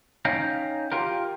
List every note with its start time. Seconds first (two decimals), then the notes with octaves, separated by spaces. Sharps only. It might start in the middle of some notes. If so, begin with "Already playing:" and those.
0.25 C#4 D#4 F5 G5 A#5
0.92 F4 G4 A#4